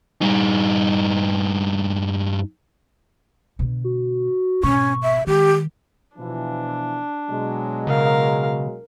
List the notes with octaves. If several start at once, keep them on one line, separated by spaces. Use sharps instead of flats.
G2 D#4
B2 D3
F#4
G#1 B2 C#4 C#6
E5
D#3 G#3 G4
B2 E3 F3 D4
B2 F#3 G#3
C#3 A#4 F5